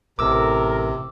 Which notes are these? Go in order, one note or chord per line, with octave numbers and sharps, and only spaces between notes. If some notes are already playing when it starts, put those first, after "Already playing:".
A1 C3 A4 A#4 D6 E6